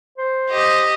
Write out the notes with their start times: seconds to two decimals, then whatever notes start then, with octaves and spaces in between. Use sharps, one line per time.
0.18 C5
0.50 G4 D#5